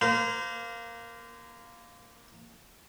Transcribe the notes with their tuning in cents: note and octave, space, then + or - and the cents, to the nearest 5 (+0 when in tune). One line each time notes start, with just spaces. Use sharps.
A#3 +0 C5 -35